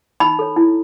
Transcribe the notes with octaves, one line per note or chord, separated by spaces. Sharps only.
D#4 B5
A4 C#5
E4